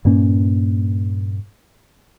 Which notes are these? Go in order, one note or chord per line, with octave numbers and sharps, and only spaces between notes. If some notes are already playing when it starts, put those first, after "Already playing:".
G2 A#2 A#3 C#4